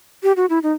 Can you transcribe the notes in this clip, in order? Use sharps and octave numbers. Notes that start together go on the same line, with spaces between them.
G4
F#4
E4
D#4